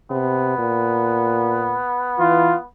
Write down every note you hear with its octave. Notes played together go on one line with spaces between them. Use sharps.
C3 B3
A#2
E3 F4